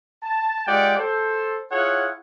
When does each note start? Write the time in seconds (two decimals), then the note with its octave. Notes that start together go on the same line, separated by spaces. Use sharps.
0.23 A5
0.66 G#3 F4 G4 D5 F#5 G5
0.97 A4 C5
1.70 E4 F4 G#4 C#5 F#5